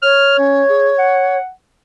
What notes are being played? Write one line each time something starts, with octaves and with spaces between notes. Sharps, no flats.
C#5 F6
C#4
G#4
F#5